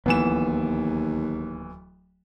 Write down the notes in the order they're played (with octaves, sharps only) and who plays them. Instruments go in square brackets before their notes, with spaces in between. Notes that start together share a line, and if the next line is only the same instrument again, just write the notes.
[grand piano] D1 E3 E7 [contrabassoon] D#2 [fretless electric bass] A#3 B3